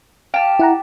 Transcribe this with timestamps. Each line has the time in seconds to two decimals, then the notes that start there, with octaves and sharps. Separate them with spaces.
0.34 G4 F5 A5
0.59 E4 F#5 A#5